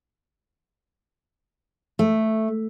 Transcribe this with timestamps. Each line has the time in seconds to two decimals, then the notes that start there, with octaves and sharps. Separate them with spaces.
1.99 A3